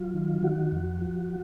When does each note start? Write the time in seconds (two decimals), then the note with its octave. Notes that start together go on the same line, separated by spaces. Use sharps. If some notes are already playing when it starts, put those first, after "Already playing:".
Already playing: F#3 F4
0.14 D#3
0.43 D#3 F#4
0.72 F2
1.01 F3